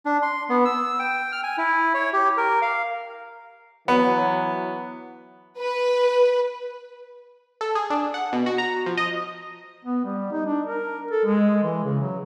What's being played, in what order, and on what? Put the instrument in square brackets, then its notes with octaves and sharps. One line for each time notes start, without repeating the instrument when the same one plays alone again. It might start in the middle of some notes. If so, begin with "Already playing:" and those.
[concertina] D4
C6
B3
E6
G5
F6
G#5
E4
C#5
G4
A#4
F5
[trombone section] E3 F#3 [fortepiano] B3
[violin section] B4
[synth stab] A4
G#4
D4
F#5
B2
F#4
A#5
F3
D#5
[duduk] B3
G3
D#4
D4
A#4
A4
G#3
E3
C#3
F#3